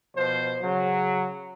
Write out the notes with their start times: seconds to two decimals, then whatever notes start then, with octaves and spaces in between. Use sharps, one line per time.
0.16 B2 F3 C5
0.61 C#3 F#3